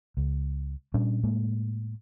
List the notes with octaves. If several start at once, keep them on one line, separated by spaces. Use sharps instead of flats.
C#2
A#2 G3 C#4 D4
A2 G#3 A#3